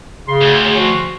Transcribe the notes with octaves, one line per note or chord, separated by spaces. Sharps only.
C#3 C6
D2
G#4 C#5
F3 F#4